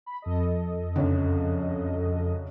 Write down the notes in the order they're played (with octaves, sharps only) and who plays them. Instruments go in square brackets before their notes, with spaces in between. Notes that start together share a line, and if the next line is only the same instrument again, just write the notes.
[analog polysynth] B5
F2 A4 D#5
[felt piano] C#2 F#2 D3